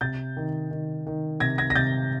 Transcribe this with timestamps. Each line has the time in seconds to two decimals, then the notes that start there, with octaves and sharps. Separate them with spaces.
0.01 C3 G6 A6
0.37 D#3
0.71 D#3
1.07 D#3
1.40 C3 G#6 A#6
1.58 G#6 A#6
1.70 A#6
1.75 C3 G6 A6